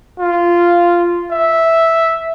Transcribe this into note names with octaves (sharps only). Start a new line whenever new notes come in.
F4
E5